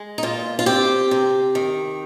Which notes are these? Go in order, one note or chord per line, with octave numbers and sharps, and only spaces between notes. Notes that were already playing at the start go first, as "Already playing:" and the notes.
Already playing: G#3
D#4
A#2 F4
F4
C4 G4
C3
D#3